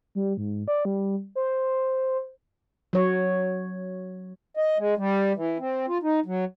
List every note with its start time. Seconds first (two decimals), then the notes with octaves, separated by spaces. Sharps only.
0.15 G3
0.37 G#2
0.68 D5
0.85 G3
1.35 C5
2.93 F#3 C#5
4.57 D#5
4.78 G#3
4.97 G3
5.35 E3
5.59 C4
5.88 F4
6.03 D#4
6.26 F#3